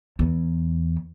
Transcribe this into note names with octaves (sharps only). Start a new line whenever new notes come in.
E2